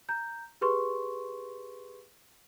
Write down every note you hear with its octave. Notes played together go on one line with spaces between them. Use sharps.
A#5 G6
G4 G#4 B4 C6 C#6